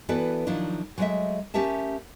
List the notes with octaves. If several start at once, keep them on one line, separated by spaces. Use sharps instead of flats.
E3 B3 F#4 A4 B4 D5
D#3 F3 F#3 D4 E4
F#3 G#3 A3 C5 D#5 E5
A3 C#4 G4 A#4 E5 A5